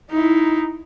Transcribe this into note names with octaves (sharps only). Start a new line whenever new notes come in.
D#4 E4